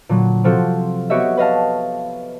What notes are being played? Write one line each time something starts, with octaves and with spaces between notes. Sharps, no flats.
A#2 D3 F#3
C3 F3 C4 F4 F#4 A4
B3 F#4 G4 C#5 D#5 E5
B4 D#5 F5 A5